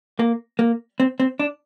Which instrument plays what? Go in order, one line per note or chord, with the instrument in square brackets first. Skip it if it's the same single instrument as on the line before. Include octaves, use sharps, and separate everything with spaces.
[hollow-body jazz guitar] A#3
A#3
C4
C4
D4